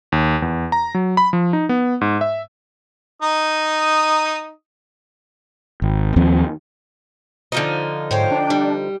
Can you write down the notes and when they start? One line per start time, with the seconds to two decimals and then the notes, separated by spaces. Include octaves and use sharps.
0.12 D#2
0.42 E2
0.72 A#5
0.95 F#3
1.17 B5
1.33 F3
1.53 D#4
1.69 B3
2.01 G#2
2.21 E5
3.22 D#4 D#6
5.82 G#1
6.16 D#2 F3 C4
7.52 D3 F3 D#4
8.11 G#2 C5 C#5 F5 G5
8.31 D4
8.50 G3